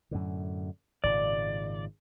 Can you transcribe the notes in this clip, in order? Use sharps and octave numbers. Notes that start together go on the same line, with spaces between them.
F#2 A2 D3
G#1 A#2 C#3 D5